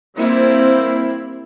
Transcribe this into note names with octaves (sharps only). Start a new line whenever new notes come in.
G3 A#3 C4 E4